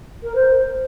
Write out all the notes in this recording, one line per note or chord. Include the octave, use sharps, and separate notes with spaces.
A#4
C5